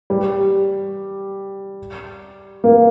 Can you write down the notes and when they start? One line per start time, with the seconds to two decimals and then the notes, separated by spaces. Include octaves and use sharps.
0.10 G3
2.64 A#3